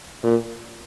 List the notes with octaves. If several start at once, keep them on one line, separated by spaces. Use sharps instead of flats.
A#2